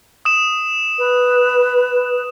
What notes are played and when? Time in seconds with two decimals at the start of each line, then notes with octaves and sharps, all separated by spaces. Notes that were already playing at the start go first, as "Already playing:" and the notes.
0.25 D#6 E7
0.99 B4